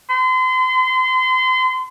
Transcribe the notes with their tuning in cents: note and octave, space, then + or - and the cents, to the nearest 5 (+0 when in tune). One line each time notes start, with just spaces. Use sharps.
C6 -35